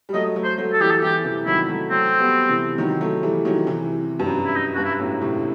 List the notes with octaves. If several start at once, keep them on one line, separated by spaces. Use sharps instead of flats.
G3
F#3 A3 D#5
F#3 A3
C5
F#3 A3
A4
E3 G3 G4
A4
E3 G3 G4
C3 E3
D#3 F#3 E4
F#3 A3
F#3 A3 C4
G3 B3
C3 E3
D#3 F#3
F#3 A3
E3 G3
D#3 F#3
C3 E3
G2
F#2
E4
D#4
G2 F#4
E4
F#2 A2
A2 C3